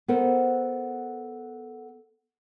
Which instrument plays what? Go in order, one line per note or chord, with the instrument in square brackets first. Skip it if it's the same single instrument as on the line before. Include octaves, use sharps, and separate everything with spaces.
[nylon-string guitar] B3 A4 A#4 C5